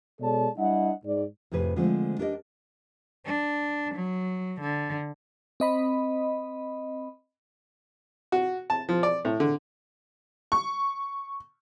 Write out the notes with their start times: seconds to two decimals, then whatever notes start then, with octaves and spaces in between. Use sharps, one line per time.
0.20 B2 G#3 A4 C#5 D5 A5
0.58 G3 D4 E4 D#5 F#5
1.04 G#2 D5
1.52 F2 A2 C3 G#4 B4
1.76 D3 F3 G#3 A3 C4
2.19 D4 G4 A#4 D5 D#5
3.26 D4
3.94 F#3
4.61 D3
5.60 C4 D#5 B5
8.32 F#4
8.70 A5
8.89 F3
9.03 D5
9.25 A2
9.40 D3
10.52 C#6